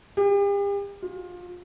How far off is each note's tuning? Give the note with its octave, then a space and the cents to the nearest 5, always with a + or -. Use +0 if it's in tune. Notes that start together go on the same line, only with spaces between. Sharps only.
G4 +40
F4 +25